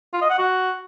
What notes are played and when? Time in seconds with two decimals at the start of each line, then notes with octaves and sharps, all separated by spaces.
0.13 F4
0.21 D#5
0.30 F#5
0.38 F#4